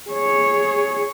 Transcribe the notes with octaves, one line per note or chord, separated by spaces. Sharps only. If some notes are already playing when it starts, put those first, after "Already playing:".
G#4 C#5